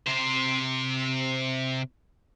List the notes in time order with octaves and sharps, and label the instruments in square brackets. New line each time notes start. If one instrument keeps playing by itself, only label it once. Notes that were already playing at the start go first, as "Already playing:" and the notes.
[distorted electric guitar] C3 C5